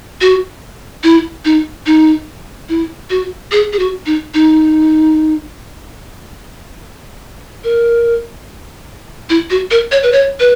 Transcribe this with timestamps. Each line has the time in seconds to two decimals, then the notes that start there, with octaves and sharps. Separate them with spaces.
0.21 F#4
1.04 E4
1.45 D#4
1.86 D#4
2.69 E4
3.10 F#4
3.52 G#4
3.73 G#4
3.79 F#4
4.06 D#4
4.34 D#4
7.64 A#4
9.30 E4
9.50 F#4
9.71 A#4
9.92 C#5
10.03 B4
10.12 C#5
10.40 B4